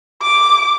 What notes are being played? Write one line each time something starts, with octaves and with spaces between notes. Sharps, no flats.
D6